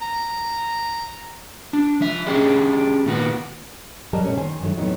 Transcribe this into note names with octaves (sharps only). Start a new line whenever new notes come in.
A#5
D4
F3 E5
C#4 D4 G4 G#4 D#5
A#2 D#3 B3 F#4
F#3 G3 A#4 D#5 A5
B2 A3 C#4
D#3 C5 G#5
G2 D#3 F3 F#3 A3
E2 A2 F#3 B3 C4 D#4